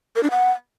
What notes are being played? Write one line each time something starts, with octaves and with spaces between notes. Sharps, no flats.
A#4
D4
F#5